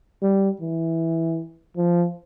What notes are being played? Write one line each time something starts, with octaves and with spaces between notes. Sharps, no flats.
G3
E3
F3